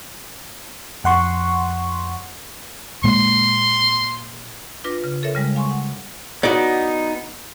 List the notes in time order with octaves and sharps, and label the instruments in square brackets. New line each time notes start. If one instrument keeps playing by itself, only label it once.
[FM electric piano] F2 F#5 C6 C#6
[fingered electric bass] A#2 G#3 A#3 [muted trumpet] C6
[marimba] D4 F4 B4 D6 A#6
C#3
A4 A#4 C#5 E5
C#3 G3 G#3
F5 G#5 C6 C#6
F#5
[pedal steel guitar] B3 D#4 [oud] F#4 D5